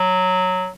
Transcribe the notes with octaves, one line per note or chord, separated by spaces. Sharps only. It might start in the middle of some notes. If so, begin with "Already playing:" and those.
Already playing: F#3